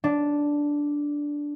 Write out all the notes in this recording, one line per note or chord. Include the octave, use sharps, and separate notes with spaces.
D4